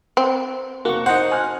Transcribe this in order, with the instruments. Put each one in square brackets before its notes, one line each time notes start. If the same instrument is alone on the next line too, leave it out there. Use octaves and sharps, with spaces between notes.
[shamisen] C4
[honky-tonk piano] F1 F#4 [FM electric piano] A#3 C#6
[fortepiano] D#4 F#5 [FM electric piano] C5
[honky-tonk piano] G#5 F6 F#6